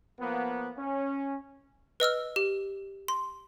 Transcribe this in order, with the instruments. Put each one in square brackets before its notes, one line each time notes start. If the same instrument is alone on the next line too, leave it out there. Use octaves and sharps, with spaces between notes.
[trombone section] F3 A#3 B3
C#4
[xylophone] B4 D#5 E6 F6
G4
C6